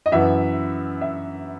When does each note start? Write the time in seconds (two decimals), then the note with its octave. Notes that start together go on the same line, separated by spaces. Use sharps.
0.06 D#5
0.12 F#2 E3 B3 E5
1.01 E5